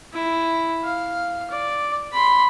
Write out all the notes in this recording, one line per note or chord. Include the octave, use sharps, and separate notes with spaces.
E4
F5
D5
B5 C6